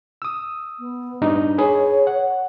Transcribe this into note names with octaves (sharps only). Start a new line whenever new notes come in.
D#6 E6
B3
G2 D4 D#4
G#4 B4 C#5
F#5